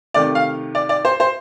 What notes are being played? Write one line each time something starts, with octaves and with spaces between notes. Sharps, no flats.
C3 D#3 A3 D5
F5
D5
D5
C5
C5